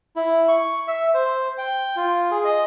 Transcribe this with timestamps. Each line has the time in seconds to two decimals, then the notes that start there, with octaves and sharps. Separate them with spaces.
0.16 E4
0.48 C#6
0.88 E5
1.14 C5
1.58 G5
1.96 F4
2.31 G#4
2.45 D#5